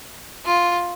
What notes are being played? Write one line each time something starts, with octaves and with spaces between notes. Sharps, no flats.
F4